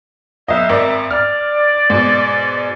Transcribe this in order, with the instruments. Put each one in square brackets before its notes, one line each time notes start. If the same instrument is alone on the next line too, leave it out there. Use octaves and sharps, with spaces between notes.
[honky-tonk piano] B1 D#5 [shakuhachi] E5
[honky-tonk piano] G#1 A#4 D5
[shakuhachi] D5 [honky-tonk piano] F6
[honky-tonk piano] G#2 B2